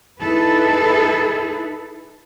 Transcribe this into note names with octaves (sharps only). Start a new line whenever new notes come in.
D#4 E4 G#4 A4 B4